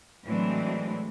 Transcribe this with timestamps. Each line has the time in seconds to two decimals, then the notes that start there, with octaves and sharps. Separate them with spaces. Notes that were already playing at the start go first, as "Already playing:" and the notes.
0.24 A2 E3 F#3 G#3 C4 D4